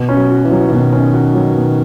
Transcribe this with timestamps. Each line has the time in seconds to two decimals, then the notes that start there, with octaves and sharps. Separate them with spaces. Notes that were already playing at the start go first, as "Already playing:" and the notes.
Already playing: B2
0.09 C#4
0.16 F#3
0.30 F#4
0.45 E3
0.51 F#3
0.68 E3
0.72 B2 D#3
0.93 C#4
1.14 F#4
1.35 F#3
1.55 B2